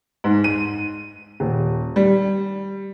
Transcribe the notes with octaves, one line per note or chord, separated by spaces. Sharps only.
G#2
D#7
D#1
G3